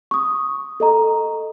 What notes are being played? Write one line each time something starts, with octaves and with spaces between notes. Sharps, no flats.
C#6 D#6
A4 D#5 A#5